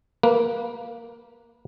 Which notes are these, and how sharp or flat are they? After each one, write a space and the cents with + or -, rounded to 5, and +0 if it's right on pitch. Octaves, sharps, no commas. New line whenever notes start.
A#3 +0 B4 -20